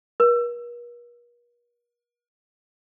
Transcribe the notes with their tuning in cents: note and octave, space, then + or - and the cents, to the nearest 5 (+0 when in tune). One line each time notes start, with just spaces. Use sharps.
A#4 +45